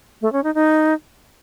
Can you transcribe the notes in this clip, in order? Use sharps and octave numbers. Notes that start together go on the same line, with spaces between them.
A3
C#4
D#4
D#4